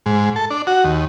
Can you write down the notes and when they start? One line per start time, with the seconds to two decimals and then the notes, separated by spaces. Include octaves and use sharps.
0.06 G#2
0.36 A4
0.50 D4
0.67 F#4
0.84 D#2